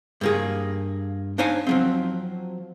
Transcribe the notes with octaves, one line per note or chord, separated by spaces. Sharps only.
G2 A#3 G#4
D4 D#4 C5 C#5 F5 G#5
F3 F#3 C4